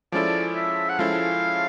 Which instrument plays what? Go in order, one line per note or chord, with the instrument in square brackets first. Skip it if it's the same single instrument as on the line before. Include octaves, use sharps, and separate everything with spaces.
[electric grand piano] F3 G#3 C#4 E4 A4 [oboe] D5
[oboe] E5
F#5
[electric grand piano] F3 G#3 C#4 E4 A4 [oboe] F5